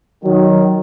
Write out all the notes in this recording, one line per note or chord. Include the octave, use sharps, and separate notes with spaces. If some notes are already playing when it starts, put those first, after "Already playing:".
D#3 F#3